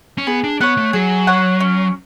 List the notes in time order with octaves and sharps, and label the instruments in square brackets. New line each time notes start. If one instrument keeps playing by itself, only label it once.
[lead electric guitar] C#4
[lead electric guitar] B3 [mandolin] G#4
[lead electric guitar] D4
[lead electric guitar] B3 [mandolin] C#5 F#5
[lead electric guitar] A3
[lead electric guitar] F#3 [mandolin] G#4
[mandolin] C#5 F#5
C#4